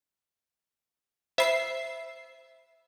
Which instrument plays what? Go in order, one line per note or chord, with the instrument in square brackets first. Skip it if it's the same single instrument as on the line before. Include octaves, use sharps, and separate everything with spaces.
[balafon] C5 B5 [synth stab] E5 C7